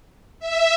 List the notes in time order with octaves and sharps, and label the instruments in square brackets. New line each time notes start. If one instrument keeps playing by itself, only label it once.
[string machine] E5